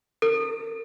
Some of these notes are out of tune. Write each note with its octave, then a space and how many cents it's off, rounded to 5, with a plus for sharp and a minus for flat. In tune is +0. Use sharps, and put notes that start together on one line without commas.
A#4 -40